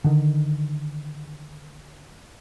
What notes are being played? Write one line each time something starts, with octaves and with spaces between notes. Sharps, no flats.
D3 D#3